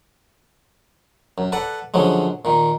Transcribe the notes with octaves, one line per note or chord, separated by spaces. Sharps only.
F#2
A4 B4 D5 F#5
F#2 D3 F3 F#3 G#3
A#2 D#3